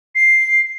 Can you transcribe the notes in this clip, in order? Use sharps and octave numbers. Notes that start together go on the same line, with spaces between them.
C7